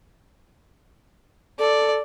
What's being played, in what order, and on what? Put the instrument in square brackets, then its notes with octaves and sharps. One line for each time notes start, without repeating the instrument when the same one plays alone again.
[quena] A4 [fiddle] D5